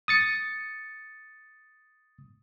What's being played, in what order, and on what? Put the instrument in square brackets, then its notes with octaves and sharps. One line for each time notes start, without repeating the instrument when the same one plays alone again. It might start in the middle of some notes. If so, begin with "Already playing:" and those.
[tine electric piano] D#6 A6 C#7